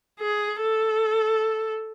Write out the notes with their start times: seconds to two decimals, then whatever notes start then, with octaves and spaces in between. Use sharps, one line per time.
0.20 G#4
0.61 A4